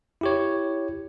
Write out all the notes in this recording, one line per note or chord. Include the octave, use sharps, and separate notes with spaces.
E4 G4 C#5